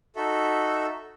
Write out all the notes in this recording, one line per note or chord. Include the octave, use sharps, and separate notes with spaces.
D#4 F#4 A4 E5